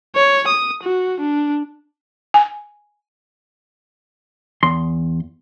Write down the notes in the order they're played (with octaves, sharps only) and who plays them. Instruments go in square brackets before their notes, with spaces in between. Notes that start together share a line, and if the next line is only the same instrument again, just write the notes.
[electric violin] C#5
D#6
F#4
D4
[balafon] G#5
[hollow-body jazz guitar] E2 C6